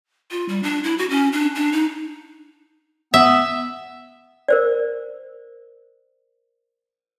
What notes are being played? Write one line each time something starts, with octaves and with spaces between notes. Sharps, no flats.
F4
G3
D4
E4
F#4
C#4
D4
D4
D#4
B3 E5
A#4 C5 D5